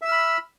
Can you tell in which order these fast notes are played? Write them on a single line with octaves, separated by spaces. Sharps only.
E5 E6 F6 B5